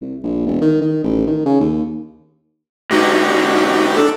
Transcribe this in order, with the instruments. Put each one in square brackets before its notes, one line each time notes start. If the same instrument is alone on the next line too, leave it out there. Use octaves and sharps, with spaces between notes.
[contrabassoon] C2
A#1
E1
D#3
D#3
A1
D#3
C#3
D#2
[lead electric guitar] G#2 D3 [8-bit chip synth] D#4 F#4 G4
[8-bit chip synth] D4 A4